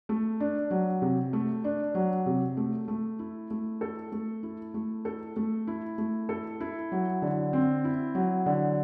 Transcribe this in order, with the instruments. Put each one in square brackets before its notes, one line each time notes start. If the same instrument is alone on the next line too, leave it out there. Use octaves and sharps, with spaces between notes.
[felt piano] A3
D4
F#3
C3
A3
D4
F#3
C3
A3
A3
E4
A3
A4
A3
E4
A3
A4
A3
E4
A3
A4
E4
F#3
D3
C4
E4
F#3
D3